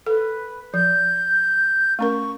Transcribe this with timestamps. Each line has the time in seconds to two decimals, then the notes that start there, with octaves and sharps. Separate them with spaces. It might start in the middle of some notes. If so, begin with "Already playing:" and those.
0.06 A4 B4
0.74 F3 G6
1.99 A3 C#4 A#4 C#6